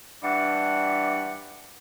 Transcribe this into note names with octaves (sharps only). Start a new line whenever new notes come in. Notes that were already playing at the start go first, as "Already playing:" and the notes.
G2 E3 D4 F#5